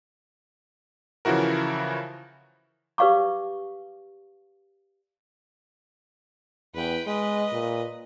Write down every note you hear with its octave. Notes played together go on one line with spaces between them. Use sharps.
C#3 E3 F3 E4 F#4 A#4
G4 B4 D5 F5 C#6 D6
E2 B4 G5
G#3 B4 D#5
A#2